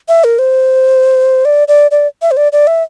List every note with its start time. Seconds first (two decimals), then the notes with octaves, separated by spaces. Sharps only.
0.08 E5
0.24 A#4
0.39 C5
1.45 D5
1.68 D5
1.91 D5
2.22 E5
2.31 C5
2.37 D5
2.52 D5
2.67 E5